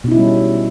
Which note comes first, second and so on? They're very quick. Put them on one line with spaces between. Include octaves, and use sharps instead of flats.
B2 D#4 E4 C#4 G3